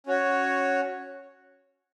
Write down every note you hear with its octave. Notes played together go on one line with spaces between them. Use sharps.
C#4 F#4 C#5